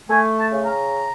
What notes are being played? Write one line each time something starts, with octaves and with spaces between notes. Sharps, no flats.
A3 G#5
A5
C#3
A#5